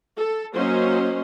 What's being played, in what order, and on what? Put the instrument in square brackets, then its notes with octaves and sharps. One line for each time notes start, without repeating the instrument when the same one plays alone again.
[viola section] A4
F#3 A#3 C#4 C5 D#5